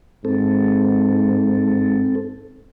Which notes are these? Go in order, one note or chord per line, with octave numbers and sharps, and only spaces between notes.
G#2 C4 A4